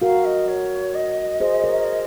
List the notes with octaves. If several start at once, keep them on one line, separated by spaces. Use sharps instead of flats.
F#4 A#4 F5
D#5
C#5
D#5
G#4 C5
A#4 C#5